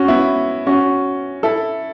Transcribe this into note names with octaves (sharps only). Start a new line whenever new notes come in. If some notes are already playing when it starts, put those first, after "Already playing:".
Already playing: C#4 F#4
B3 E4
C#4 F#4
E4 A4